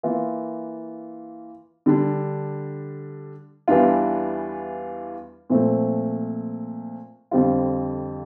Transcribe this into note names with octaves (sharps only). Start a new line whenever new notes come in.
E3 A#3 F4
D3 G3 D4
E2 E3 G3 D4 F4
A#2 F3 A3 C4
F2 D3 G3 C4 F4